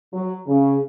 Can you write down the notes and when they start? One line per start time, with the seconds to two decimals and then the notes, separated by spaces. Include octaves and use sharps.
0.13 F#3
0.47 C#3